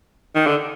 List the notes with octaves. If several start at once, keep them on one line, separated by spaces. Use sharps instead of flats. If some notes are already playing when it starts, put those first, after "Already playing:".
D#3
D3